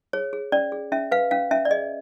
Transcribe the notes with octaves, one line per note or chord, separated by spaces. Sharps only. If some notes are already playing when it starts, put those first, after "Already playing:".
G#4 C#5
G#4
C#4 D5
G#4
C#4 E5
B4 F5
C#4 F5
C#4 E5
D5
G#4 D#5